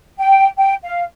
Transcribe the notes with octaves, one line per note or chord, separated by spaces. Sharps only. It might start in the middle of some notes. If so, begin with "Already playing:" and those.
G5
G5
F5